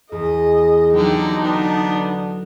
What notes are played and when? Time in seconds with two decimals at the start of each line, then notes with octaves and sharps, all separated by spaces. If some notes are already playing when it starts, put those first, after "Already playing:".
0.12 E2 G#4 D#5
0.93 D3 F#3 D#4 G4 B4
1.43 D3 B3 D4